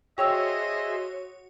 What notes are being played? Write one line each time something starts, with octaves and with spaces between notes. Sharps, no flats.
F#4 G#4 C5 C#5 D#5 E5 G5 E6